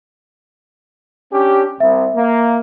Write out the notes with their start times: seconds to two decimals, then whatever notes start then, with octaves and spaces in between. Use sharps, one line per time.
1.33 C#4 D4 G4
1.80 C2 E5
2.16 A#3